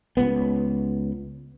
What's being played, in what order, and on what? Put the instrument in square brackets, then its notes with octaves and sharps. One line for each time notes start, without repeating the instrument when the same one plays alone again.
[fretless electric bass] C#2 B3